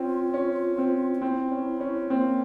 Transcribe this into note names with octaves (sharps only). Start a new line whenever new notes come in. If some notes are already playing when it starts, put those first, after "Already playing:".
Already playing: C4 C#4 F4
C#4
C4
F4
C4 E4
C#4
C#4
A#3 C4